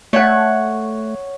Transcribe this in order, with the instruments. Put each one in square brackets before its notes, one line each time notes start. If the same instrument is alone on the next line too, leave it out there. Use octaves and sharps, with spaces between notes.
[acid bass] A3 [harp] C#5 F#5